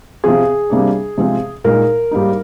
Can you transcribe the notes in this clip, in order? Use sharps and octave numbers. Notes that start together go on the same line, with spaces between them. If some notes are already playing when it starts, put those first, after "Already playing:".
C3 F3 C4 G#4
C3 G3 A#3 D4
C3 F3 G#3 C4
A#2 G#3 D#4 A#4
G#2 G3 A#3 D#4